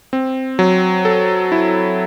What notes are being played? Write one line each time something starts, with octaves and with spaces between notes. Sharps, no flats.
C4
F#3
A4
E4